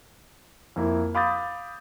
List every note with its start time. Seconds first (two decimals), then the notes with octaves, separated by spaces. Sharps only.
0.76 F2 A#3 E4
1.15 F5 B5 D6 D#6 G6 A6